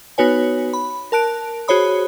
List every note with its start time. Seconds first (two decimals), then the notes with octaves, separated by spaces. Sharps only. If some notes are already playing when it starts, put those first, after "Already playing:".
0.18 B3 D#4 F#4 B4 C#5 G#5
0.73 B5
1.12 A#4 A5 F#6 D7
1.68 F#4 G#4 C5 C#5 B5 D#6